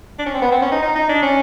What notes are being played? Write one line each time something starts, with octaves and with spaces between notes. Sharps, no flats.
D4
C#4
C4
B3
C4
C#4
D#4
D#4
D#4
D4
C#4